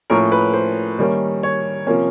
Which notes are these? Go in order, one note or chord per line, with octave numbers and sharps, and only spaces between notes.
A2 F3 A#3 C#4 A#4
B4
C5
D#3 G3 A#3 C#4
C#5
C3 F3 A#3 C#4